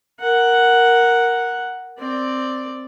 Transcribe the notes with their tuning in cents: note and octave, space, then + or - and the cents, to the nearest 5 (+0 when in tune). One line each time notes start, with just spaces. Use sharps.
A#4 +0 F#5 +0
C4 +0 D5 +0